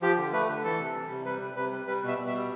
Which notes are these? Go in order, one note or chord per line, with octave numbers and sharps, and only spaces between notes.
F3 G4
D3
A3 B4
D3
E3 A4
C3
G3
C3
G3 B4
C3
C3 B4
G3
G3 B4
B2
E5
B2
E5
G3